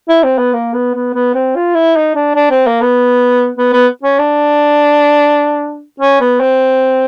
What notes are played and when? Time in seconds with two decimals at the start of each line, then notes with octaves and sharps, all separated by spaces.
0.09 E4
0.23 C4
0.38 B3
0.53 A#3
0.74 B3
0.94 B3
1.14 B3
1.35 C4
1.56 F4
1.75 E4
1.96 D#4
2.15 D4
2.35 D4
2.51 C4
2.67 A#3
2.81 B3
3.58 B3
3.73 B3
4.03 C#4
4.19 D4
6.00 C#4
6.20 B3
6.40 C4